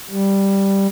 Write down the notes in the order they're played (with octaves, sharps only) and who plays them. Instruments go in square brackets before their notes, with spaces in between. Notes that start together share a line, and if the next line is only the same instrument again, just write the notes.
[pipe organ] G3